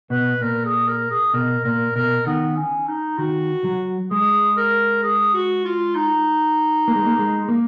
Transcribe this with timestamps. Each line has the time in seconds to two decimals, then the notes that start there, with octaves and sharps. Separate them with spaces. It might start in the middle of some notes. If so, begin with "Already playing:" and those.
0.10 B2 B4
0.41 A#2 A#4
0.65 G#4
0.87 A#4
1.10 G#4
1.33 B2 A#4
1.64 A#2 A#4
1.95 B2 A#4
2.26 D#3 B3
2.56 C#4
2.87 D#4
3.18 D#3 F#4
3.64 F#3
4.10 G#3 G#4
4.57 A#4
5.03 G#4
5.34 F#4
5.65 F4
5.95 D#4
6.88 A#3
6.96 G#3
7.05 A#3
7.19 G#3
7.48 A#3